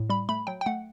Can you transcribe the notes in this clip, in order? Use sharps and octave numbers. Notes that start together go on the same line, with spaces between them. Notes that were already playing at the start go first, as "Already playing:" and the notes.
Already playing: A2
G3 B5
A3 B5
F#3 G5
G5
A3 F#5